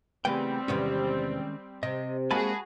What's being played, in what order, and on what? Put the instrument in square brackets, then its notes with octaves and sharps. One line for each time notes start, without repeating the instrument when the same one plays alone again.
[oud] C#3 E3 B4 [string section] G3 C4 [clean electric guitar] A3 B3 G5
[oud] E2 C3 B3 [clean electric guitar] D#3 G#3 C#4
[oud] C3 [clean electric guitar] D#5
[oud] G#3 A#3 [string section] F#4 G#4 [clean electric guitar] G#5 A5 B5